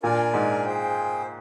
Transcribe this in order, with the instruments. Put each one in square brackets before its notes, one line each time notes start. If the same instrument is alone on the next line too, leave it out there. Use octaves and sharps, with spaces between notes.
[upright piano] A#2 [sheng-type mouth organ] D4 F4 A#4 D5 G#5
[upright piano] G#2
[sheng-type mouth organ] G#4 C5 G5